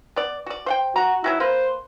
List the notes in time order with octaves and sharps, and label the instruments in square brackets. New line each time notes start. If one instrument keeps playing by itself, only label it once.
[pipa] B3 D5
F#4 D5
C5 F#5 G5
[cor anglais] F#4 [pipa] A#5
[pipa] F#3 C#4 F#4 [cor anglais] E4
[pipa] A#3 B4 [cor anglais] C5